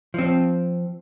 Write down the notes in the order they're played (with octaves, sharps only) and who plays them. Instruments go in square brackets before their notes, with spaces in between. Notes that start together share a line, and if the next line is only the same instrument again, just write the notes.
[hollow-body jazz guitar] F3 C4